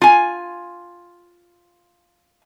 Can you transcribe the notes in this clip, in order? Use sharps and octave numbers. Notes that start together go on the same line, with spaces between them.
F4 G#5